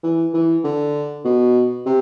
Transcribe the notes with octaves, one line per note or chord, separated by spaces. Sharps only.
E3
E3
D3
B2
C3